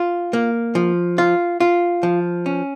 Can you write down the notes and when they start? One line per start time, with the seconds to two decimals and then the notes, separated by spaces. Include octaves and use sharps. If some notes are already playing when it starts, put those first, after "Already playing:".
Already playing: F4
0.33 A#3
0.75 F3
1.18 F4
1.60 F4
2.03 F3
2.46 C#4